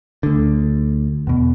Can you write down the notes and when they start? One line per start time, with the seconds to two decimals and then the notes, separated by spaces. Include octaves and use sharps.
0.23 D2 D3
1.27 E2 B2